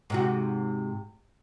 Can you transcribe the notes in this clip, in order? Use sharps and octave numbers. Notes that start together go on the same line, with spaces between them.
G#2 C3 F#4